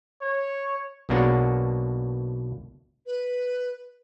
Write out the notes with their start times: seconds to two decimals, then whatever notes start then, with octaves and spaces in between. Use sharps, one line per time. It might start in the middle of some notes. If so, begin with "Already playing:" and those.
0.22 C#5
1.09 B1 B2 A#3 D4 C#5 F#5
3.06 B4